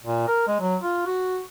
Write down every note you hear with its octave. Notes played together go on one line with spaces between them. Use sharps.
A#2
A#4
G#3
F#3
F4
F#4